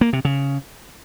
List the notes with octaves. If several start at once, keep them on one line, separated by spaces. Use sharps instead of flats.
A#3
C3
C#3